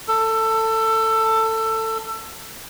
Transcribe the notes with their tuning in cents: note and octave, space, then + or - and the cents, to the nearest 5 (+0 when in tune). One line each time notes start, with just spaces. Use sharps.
A4 +20